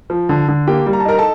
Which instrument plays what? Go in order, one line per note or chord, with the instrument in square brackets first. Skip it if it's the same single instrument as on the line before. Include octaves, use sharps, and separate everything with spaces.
[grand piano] F3
D3
D3
A#3 G4 G5
G3
A#5
A5
D#4 A#4 A#5
A4 A5